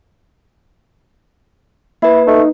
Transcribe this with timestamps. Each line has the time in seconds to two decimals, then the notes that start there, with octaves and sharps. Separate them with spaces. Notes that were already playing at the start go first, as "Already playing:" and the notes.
2.02 A#3 E4 B4
2.27 A3 D#4